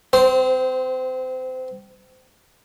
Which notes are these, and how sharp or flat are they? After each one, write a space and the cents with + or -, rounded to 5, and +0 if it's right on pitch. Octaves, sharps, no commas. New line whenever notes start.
C4 -25 C5 +0